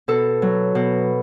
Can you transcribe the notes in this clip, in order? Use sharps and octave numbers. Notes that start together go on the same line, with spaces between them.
B2 A4
F#3
B2